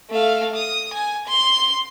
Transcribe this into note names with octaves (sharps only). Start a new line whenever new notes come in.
A3 F5
D#6
G#5
C6